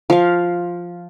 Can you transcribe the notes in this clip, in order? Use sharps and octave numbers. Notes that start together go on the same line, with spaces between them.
F3 F5